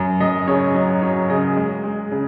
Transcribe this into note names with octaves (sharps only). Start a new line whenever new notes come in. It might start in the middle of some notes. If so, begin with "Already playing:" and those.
Already playing: F#2
F#2 D#5
C#3 C#5
F#3 D#5
F#3 C#5
C#3 D#5
G#3
G#3
C#3